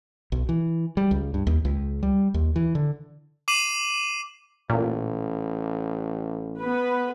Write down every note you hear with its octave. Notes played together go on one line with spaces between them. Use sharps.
B1
E3
G3
C#2
G2
D#2
C#2
G3
D#2
E3
D3
D6 C7 D#7 E7 F#7
A1 A#2
B3 B4